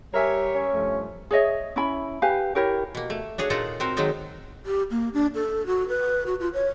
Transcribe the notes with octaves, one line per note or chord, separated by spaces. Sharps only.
G3 G4 A#4 C#5 E5 G#5
C#4
G2 F3 A3
G#4 C#5 D#5 E5
C#4 E4 B5
G4 B4 F5 G#5
E4 G4 A#4 C#5
B2 A#3
A3
D4 F#4 G#4 C#5
A#2 D#4 F4 A4 F#5 A#5
C4 F#4 A#4 C5
D#3 F#3 G#3 D#4 A4
G4
A#3
D4
A4
F#4
B4
F#4
F4
C#5